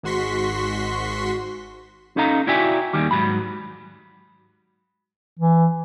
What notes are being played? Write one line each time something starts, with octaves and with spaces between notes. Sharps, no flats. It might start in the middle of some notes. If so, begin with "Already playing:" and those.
G#1 G#2 F#4 C6 C#6 B6
C#4 D#4 A4 D#5 F5 A#5
E4 F#4 D5 E5 G5 G#5
D#2 D#3 G3
G#2 F#3 B5
E3